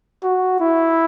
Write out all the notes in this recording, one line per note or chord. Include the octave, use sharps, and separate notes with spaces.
F#4
E4